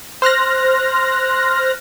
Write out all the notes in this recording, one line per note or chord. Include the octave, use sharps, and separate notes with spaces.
C5 F6 F#6 A#6